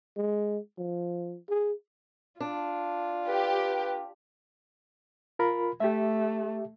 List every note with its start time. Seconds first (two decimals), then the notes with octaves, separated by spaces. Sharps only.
0.17 G#3
0.78 F3
1.49 G#4
2.40 D4 F4
3.27 G4 B4
5.39 F4 A#4 B5
5.80 A3 G4 E5